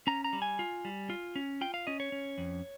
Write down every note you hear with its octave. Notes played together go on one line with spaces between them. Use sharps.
C#4 A#5
A#5
G3
G#5
F4
G3
F4
C#4
F4 G5
F5
C#4 D#5
C#5
C#4
F2